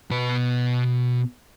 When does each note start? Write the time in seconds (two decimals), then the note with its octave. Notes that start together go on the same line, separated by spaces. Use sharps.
0.11 B2 B4